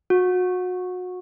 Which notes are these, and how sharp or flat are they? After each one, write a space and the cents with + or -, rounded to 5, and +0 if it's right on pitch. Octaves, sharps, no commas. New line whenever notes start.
F#4 -30